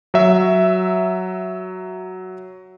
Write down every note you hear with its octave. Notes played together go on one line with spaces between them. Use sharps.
F#3 E5